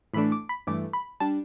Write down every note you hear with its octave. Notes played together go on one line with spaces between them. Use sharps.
A2 E3 A3 D4 B5
D6
B5
G2 E3 A3 D6
B5
G3 D4 A5